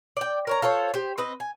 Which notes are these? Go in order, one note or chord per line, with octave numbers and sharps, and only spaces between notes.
D5 G5
A#4 C#5 A#5
F4 A4 C5 C#5
G4 C5
C4 B4 D#5
G#5